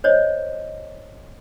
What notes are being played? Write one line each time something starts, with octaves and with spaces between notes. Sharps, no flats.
C5 C#5 D#5